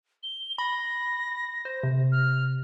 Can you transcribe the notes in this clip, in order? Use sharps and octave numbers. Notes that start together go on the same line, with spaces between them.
G7
B5 A#6
C5
C3
F6